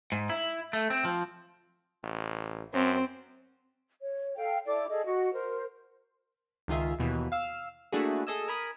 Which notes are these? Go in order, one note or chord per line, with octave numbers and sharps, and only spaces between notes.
G#2
E4
A3
C4
F3
A1
F#2 C4
C#5
A4 F5 G5
E4 A4 D5 D6
G#4 A4 D#5
F#4 D#5 F#5
A#4 C5
C#2 D#3 F4 G#4 E5
D#2 B2 E3
F5 E6
A3 A#3 D4 E4 F#4 G#4
G#4 A4 D#5 G#5 E6
A#4 G#5 B5 D#6